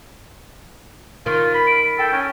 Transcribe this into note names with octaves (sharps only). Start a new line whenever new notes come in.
D#3 F4
B5
D7
A4 G5
C#4